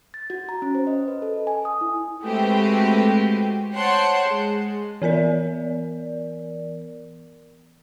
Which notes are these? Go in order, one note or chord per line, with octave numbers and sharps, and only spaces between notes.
A6
F#4
A#5
C#4
C5
D#5
B4
A4
G#5
D#6
E4
G#3 A3 C4 F#4 G4 B4
C5 C#5 F#5 G5 A5 C6
G#3
E3 B3 A#4 D5